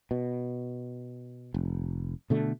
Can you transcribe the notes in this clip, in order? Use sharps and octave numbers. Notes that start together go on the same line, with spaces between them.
B2
F1
B2 D3 A3